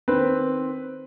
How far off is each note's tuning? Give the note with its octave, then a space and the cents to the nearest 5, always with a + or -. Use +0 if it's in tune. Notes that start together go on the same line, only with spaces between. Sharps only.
D#3 +0 C4 +0 B4 +0